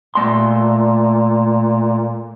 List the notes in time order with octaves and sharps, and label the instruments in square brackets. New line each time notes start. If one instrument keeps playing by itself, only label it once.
[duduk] A#2 [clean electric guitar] A3 C6